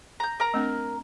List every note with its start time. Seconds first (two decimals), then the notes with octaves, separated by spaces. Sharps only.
0.20 A#5 G6
0.40 A#4 A#5
0.54 A3 C4 D4